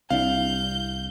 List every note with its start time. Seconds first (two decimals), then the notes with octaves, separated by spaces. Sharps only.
0.10 C2 C4 D4 E4 F5 G6